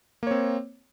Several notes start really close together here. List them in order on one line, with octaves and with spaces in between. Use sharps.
A#3 C#5 C4